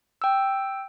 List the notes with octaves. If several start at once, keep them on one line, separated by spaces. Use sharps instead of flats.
G5 E6